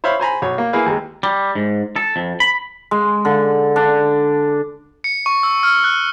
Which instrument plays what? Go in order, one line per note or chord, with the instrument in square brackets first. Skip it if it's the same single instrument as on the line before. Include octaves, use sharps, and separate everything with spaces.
[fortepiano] C5 C#5 E5 F5 B5
C5 G#5 A#5 B5
B1 C#5
A#3
A#3 E4 G#4 B4 F5
D#2 G#3
[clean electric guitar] G3
G#2
A4
F2
B5
[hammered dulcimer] G#3
D3
D4
[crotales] C#7
C#6
E6
F6
F#6